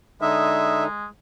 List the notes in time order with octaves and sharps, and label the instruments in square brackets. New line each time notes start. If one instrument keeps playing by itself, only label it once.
[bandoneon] D3 D#4 [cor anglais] G#3 [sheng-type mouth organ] E5